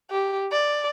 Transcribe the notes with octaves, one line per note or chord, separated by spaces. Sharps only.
G4
D5